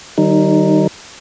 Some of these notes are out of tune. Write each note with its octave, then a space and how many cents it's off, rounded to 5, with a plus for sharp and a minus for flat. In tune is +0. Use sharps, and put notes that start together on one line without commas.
D#3 -30 G3 -40 D#4 +0